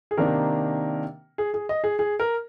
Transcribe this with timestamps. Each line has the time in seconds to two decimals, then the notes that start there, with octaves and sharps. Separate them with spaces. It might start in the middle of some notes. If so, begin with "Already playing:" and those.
0.11 G#4
0.17 C3 D#3 A#3 D4 A#4
1.38 G#4
1.54 G#4
1.69 D#5
1.84 G#4
1.99 G#4
2.20 A#4